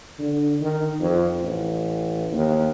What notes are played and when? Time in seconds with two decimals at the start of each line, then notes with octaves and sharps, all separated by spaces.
0.19 D3
0.61 D#3
1.00 F2
1.41 A1
2.32 D#2